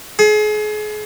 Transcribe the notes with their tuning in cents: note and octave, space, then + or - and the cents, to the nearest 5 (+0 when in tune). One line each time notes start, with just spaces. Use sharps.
G#4 +35